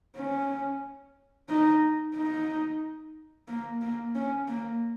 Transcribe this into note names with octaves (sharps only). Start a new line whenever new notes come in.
C#4
D#4
D#4
A#3
A#3
C#4
A#3